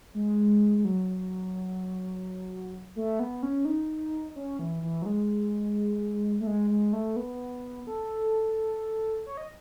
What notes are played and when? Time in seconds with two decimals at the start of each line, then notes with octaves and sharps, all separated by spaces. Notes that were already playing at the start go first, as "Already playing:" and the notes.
0.14 G#3
0.78 G#3
0.85 F#3
2.96 A3
3.20 B3
3.43 C#4
3.65 D#4
4.36 C#4
4.59 E3
4.83 E3
5.02 F#3
5.06 G#3
6.40 A3
6.47 G#3
6.70 G#3
6.93 A3
7.16 B3
7.87 A4
9.26 C#5
9.37 D#5